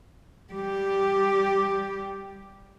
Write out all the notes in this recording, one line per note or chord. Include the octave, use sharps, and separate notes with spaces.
G3 G4